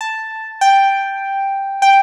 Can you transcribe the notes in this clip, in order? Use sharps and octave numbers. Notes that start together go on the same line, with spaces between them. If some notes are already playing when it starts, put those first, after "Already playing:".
A5
G5
G5